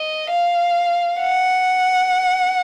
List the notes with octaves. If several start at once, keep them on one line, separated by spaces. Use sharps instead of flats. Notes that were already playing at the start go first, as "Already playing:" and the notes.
Already playing: D#5
F5
F#5